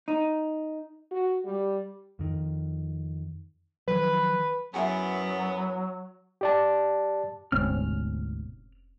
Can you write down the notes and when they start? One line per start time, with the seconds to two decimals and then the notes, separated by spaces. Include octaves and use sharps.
0.08 D#4
1.11 F#4
1.45 G3
2.19 F2 D#3
3.88 D#3 F3 F#3 B4
4.74 F#2 F#3 B3 E4 F#4 G#4
6.41 G4 D5 A5
7.52 F1 D2 G#2 B2 C4 C#4 F6